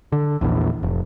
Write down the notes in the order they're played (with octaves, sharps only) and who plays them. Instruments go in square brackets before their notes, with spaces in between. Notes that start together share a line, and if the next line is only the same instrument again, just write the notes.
[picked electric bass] D3
A#1 E2
F1